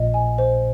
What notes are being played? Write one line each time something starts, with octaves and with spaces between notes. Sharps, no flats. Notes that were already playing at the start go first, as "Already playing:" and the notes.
Already playing: A#1 A#2 D#5
G#5
C5